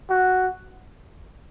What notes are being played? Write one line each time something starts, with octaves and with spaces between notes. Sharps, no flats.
F#4